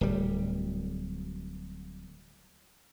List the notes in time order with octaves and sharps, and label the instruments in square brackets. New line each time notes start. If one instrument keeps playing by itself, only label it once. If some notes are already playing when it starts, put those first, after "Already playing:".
[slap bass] D1 G3